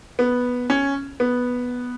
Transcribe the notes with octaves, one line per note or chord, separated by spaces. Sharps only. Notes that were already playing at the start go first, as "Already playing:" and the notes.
B3
C#4
B3